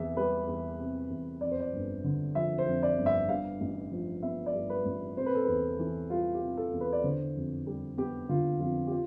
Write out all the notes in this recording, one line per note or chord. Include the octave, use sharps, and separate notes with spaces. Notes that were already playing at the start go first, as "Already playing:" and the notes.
Already playing: E2 C3 E5
G3 B4
E2
C3
E2
F2 D5
C5
D5
G1
D3
F3 E5
C5
F2
D5
G1
E5
G2 F5
A1
F3
B3 E5
D5
G2
B4
A1
C3 C5
B4
A4
E2 B4
E3
G3 F4
G4
C3
A4
E2
B4
D5
D3 C5
F2
G3
B3 G4
D3 F4
F2 F4
G4
F4